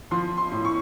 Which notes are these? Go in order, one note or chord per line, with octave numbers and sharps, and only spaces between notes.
F3 C6
C6
A2
C#6